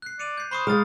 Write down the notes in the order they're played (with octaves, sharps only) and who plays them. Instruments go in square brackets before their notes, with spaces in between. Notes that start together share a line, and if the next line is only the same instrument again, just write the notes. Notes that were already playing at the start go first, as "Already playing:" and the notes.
[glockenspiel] F#6 C7
[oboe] D5 [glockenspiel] C#7 D#7 F7
[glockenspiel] G6 C7
[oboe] C5 [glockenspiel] B5 C#6 D#6
[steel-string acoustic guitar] G#3 [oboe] F5 [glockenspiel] A#5 D#6 A6